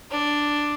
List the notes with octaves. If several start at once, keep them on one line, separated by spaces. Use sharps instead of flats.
D4